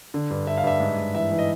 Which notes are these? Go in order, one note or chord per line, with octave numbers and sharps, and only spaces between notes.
D3
G2
G2 E5
F5
G2 E5
G#2
G#2
E3 E5
E3
D#5